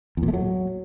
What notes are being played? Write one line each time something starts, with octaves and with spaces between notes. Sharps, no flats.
E2
A#2
A3
F#3